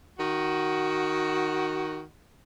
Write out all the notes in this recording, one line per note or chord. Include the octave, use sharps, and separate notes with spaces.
D#3 F#4